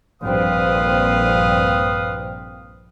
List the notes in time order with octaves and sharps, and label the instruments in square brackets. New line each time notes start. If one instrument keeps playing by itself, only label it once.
[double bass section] A#1 G2 C4 [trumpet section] B4 F5 D#6